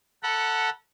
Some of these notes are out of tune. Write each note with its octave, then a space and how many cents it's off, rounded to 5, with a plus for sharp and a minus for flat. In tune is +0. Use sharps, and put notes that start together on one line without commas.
A4 +10 F#5 +0 B5 -40